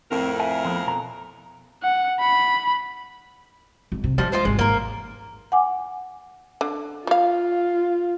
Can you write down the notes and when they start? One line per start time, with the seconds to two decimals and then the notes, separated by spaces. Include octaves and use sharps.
0.12 F2 A2 C4 A#4
0.39 E5 G#5
0.65 F3 B3
0.86 B1 B2 A#5
1.83 F#5
2.20 B5
3.92 G#1 G#2
4.04 C3
4.18 F3 G3 G#3
4.32 D#4 F4 C5
4.45 G#1 G#3
4.59 G#2 E3 A#3 A#4
5.52 F#5 G#5 D6
6.61 D3
7.07 G3 F4 F5